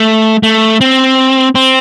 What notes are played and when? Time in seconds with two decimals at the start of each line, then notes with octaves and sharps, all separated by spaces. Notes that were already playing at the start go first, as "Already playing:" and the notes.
Already playing: A3
0.43 A3
0.81 C4
1.55 C4